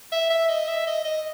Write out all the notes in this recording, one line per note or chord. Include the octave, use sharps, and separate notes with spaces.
E5
E5
D#5
E5
D#5
D#5